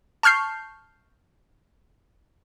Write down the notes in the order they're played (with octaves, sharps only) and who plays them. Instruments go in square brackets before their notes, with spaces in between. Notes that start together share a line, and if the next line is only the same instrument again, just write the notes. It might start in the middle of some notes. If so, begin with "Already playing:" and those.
[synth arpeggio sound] A5 C#6 F6 G6 C7